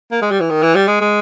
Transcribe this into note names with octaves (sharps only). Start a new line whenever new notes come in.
A#3
G#3
G3
E3
D#3
E3
G3
G#3
G#3